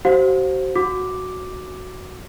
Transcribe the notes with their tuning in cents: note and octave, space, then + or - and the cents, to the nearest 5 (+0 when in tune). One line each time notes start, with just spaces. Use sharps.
F#4 +45 C5 +10 F5 +35
F#4 +0 D6 +0